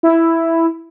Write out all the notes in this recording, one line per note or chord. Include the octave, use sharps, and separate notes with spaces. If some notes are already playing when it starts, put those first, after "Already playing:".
E4